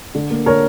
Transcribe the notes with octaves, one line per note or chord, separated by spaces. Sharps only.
D3
A#3
D3 A#4 C#5